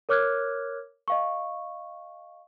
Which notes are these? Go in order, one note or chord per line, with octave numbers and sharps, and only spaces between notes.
A#4 C#5 D6 F6 F#6 G#6
D#5 F5 C#6